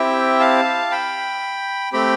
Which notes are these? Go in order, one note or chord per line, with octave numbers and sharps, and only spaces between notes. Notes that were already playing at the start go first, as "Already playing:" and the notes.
Already playing: C4 E4 G4 E5 G5
F5 A5
G5 B5
A3 C4 G4 G5 B5